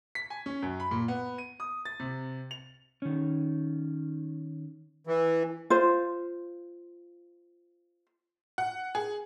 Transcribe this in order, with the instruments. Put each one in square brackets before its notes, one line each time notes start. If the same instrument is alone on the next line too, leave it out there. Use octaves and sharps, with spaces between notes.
[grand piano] B6
G#5
C#4
F#2
B5
A#2
B3
D#7
D#6
A6
C3
F7
[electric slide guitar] D#3 C#4
[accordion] E3
[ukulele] F4 C5
[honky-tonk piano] F#5
G#4